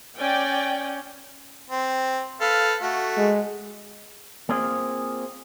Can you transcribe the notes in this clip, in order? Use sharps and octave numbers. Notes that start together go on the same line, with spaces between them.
C#4 D5 G5
C4
A4 B4 F5
A3 F#4
G#3
A#3 C4 F4 G#4